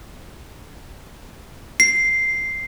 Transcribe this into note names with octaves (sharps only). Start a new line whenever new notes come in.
C7